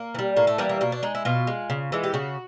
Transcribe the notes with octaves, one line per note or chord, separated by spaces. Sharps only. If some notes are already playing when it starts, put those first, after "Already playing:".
Already playing: A#3
E3
G3
A2 A#3
A3
E3 G3 A#3
A#3
B2 A#3
D4
G#3 D#4
E4
B2 F4
G#3
C#3
E3 G#3
G4
C#3 F#4